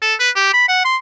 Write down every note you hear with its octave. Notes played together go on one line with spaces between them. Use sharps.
A4
B4
G4
B5
F#5
C6